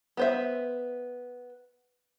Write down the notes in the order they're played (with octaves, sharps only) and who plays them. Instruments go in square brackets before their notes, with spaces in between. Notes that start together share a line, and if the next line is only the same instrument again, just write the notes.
[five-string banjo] B3 C5 E5